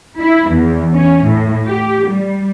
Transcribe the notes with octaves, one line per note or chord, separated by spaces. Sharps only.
E4
E2
C#4
A2
G4
G3